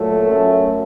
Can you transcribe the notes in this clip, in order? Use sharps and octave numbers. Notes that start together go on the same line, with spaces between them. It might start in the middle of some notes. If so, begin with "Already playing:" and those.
Already playing: A#2 F#3 A3
F#2 F#3